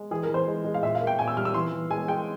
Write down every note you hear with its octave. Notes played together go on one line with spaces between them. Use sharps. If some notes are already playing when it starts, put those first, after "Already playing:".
Already playing: G#3
E3 G#4
A#4
E3
C5
G#3
G#3
F5
A#2 E5
F5
A#3
G5
A#2 G#5
E6
G3 F6
E6
E3 C6
E3
G#3 G#5
G#3 G5